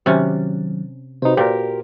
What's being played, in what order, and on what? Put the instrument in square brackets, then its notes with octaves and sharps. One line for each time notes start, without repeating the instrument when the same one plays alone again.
[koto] C3 C#4 [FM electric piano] D#3 F#3
[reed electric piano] C3 D#4 [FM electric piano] F#4 B4 C5
[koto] A#2 [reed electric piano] G4 A#4